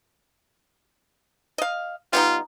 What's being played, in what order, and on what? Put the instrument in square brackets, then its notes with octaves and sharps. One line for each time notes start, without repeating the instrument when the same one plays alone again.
[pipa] D#5 F5
[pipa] G3 B3 D#4 [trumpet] F4